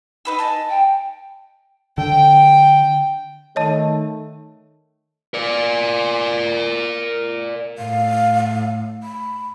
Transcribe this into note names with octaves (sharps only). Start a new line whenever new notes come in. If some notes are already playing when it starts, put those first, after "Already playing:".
D#4 B4 E6
D#5 G#5 A5
G5
D3 G5
D#3 A3 C#5 D#5 A5
A#4 D5
A2 F5
B5